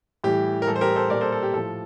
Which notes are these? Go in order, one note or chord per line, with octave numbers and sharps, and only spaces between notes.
A2 E3 G3 G4
A#4
A2 E3 G3 A4
C5
G4 A#4
A4 C5
A#2 G3 A#4 D5
A4 C5
A4
G4
A2 F3 A4